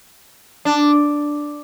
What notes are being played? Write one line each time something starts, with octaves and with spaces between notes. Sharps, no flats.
D4